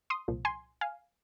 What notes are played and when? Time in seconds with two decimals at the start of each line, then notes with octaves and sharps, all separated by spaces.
0.10 C6 D#6
0.28 C2 A#2 F3
0.45 G#5 C6
0.81 F5 G#5